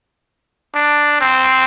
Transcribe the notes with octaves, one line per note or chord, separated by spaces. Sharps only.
D4
C4